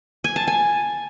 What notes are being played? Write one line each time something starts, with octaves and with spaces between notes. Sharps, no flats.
G#5
A5
G#5